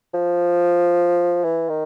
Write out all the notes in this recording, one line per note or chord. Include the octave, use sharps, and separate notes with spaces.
F3
E3
D#3